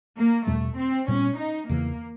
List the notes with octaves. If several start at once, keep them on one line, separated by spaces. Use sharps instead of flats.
A#3
E2 B2 G3 A3 B3
C4
A#2 G3 B3 C#4
D#4
E2 C#3 E3 A#3